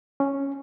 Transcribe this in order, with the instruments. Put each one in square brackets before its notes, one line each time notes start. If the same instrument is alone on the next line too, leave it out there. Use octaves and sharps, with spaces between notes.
[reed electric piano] C#4